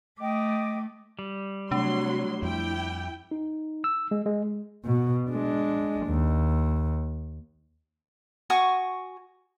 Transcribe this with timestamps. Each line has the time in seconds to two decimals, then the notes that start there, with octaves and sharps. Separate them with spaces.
0.20 A3 D#5 G5 D6
1.19 G3
1.71 C3 F#3 A3 D4 C6
2.42 F2 F3 E4 G5
3.31 D#4
3.84 E6
4.11 G#3
4.26 G#3
4.85 B2
5.30 G#3 D4
6.07 D#2
8.50 F#4 G#5 C#6 D#6